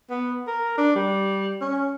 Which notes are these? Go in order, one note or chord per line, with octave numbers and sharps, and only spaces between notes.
B3
A#4
D4
G3
C#4